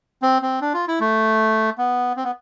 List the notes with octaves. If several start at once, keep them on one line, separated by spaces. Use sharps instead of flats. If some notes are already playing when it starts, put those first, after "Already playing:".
C4
C4
D4
F4
E4
A3
B3
C4
B3